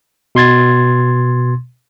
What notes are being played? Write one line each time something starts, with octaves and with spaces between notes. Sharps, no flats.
B2 C6 G#6 A6